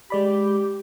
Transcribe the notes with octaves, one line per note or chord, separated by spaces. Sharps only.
G#3 G4 D5 B5